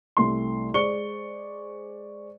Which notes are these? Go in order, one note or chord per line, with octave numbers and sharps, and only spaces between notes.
C2 A3 C6
G#3 C5 D5 C#6 C#7 G7